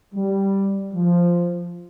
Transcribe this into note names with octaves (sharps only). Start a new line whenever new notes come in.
G3
F3